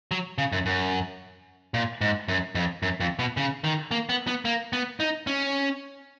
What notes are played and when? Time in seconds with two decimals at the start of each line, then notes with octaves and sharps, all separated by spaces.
0.11 F#3
0.38 C#3
0.52 F#2
0.66 F#2
1.74 A#2
2.01 G#2
2.28 F#2
2.55 F2
2.83 F#2
3.00 F2
3.19 B2
3.37 C#3
3.64 D#3
3.91 A#3
4.09 B3
4.27 B3
4.45 A#3
4.73 B3
5.00 D#4
5.27 C#4